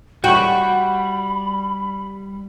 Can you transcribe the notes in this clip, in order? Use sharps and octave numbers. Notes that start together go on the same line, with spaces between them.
G3 F#4 G5 B5 C#6